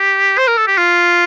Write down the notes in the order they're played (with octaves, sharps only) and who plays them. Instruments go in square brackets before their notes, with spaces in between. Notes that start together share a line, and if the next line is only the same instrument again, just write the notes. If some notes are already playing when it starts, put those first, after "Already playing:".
Already playing: [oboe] G4
C5
A#4
A4
G4
F4